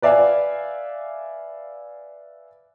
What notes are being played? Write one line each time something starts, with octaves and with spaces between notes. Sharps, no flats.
B4 D5 E5 F5 G#5